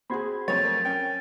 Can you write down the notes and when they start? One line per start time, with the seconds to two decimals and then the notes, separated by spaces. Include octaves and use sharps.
0.10 C4 F#4 G#4 B5 C6 G#6
0.48 F2 F#3 A3 C#5 A6
0.65 A#4
0.85 C#4 G5